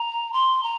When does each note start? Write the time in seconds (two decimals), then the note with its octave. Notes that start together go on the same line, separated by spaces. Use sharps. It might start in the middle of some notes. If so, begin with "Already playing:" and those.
Already playing: A#5
0.32 C6
0.63 A#5